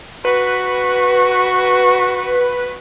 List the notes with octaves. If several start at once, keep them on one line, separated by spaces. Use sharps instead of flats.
F#4 B4